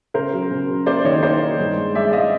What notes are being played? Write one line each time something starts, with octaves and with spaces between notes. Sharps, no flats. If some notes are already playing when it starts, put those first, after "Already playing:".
C#3 A#4 C5
F#3
C#3
F#3
A#3 C5 D5
D#3 C#5 D#5
A#3 C5 D5
D#3
G2
G#3
G#3 D5 E5
G#3 D#5 F5